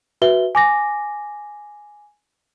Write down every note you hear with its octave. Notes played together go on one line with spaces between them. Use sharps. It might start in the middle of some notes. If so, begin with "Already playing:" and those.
F#4 B4 E5 G7
G#5 D6 A#6